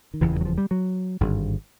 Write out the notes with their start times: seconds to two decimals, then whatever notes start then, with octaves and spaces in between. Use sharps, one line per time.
0.14 D#3
0.21 F1 E2 C#3 E3
0.33 E3
0.41 F#3
0.45 F3
0.58 G3
0.71 F#3
1.21 G#1 G2 D3